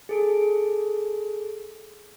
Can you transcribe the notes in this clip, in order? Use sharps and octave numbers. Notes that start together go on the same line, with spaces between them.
G#4 A4 D7